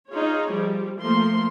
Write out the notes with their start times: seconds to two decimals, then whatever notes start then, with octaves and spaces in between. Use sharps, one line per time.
0.11 D#4 F4 G#4 C#5
0.52 F3 G3
1.01 F3 A3 A#3 C6